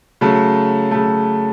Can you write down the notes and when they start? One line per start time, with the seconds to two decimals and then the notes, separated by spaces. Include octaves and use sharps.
0.21 C#3 F#3 A3
0.91 C#3 F#3 A3